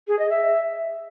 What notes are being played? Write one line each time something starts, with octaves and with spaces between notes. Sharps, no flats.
G#4
D#5
E5